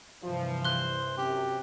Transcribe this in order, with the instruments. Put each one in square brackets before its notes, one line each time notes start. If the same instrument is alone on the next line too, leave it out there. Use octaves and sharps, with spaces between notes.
[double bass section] G2 C3 E3 [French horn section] F3
[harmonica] C5 [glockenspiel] F#6 G7
[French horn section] F#2 C3 [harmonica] G4